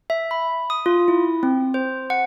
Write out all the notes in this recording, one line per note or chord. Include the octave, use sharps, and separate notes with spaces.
E5
B5
D#6
F4
E4
C4
C5
F#5